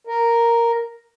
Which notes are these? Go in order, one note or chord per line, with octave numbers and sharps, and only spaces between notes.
A#4